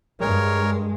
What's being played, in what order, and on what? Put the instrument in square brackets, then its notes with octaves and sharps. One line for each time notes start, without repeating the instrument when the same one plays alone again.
[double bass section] G2 G#3 [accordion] A#4 C#5